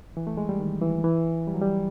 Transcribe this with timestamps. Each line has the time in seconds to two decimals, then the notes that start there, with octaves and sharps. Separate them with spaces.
0.17 E3
0.27 A3
0.37 G#3
0.49 G3
0.60 D#3
0.82 E3
1.04 E3
1.47 G3
1.54 F#3
1.61 G3